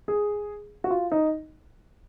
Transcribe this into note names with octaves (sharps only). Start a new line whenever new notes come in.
G#4
F#4
F4
D#4